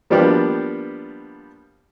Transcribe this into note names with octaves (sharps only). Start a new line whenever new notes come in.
F3 G3 A#3 B3 D4 G4